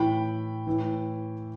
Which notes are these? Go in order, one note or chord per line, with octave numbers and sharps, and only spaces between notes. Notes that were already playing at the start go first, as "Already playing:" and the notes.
Already playing: A2 E3 G5 B5
A2 E3